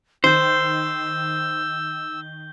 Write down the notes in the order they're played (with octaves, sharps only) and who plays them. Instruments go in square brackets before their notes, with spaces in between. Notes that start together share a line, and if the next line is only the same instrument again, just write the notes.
[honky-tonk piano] D#3 [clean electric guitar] C5 [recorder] E6 [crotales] G6 G7